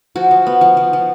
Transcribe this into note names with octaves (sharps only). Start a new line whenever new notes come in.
F3 F#4
F3
B3
F3
F3
F3